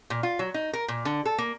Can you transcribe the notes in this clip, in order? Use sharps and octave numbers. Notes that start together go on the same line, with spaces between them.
A#2
F4
F#3
D#4
A#4
A#2
D3
A4
A#3